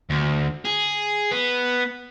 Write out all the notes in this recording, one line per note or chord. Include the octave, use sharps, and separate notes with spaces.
D2
G#4
B3